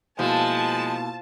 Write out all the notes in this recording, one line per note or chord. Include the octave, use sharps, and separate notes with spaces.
B2 F3 G#3 A#3 E4 A5